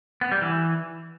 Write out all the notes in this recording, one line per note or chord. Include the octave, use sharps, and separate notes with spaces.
B3
G3
E3